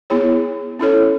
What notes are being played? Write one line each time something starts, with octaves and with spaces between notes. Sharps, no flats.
B3 E4 G#4 C#5
C#4 E4 A4 C#5